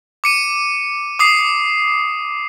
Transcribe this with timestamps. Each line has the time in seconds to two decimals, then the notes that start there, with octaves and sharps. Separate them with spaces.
0.24 D6 C#7 D#7
1.19 D6 D#6 C7